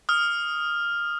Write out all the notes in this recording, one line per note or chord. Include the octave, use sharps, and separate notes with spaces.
D#6 F6